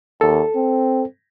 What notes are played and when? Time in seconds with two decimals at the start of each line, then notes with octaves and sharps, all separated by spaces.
0.21 D#2 A4
0.56 C4